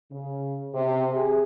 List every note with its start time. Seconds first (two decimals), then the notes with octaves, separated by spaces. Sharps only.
0.10 C#3
0.74 C3
1.11 G#4